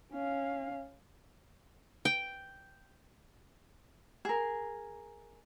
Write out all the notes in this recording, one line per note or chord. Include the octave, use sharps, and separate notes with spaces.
C#4 F5
G5
G#4 A#4